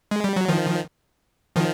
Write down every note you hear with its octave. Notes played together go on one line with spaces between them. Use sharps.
G#3
G3
F#3
D#3 F3
D#3 F3